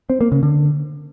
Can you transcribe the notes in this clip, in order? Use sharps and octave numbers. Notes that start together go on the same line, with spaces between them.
C4
A#3
C#3
D3